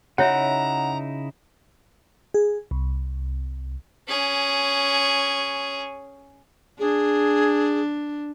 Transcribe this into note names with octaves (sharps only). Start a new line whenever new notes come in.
C#3 D#4 E4 F#4 C#5 E5 F#5 A#5
G#4
C2
C#4 G#4
D4 G#4